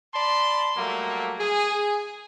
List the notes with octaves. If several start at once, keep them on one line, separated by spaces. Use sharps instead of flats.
D5 A5 B5 C6
F#3 G3 A3 A#3
G#4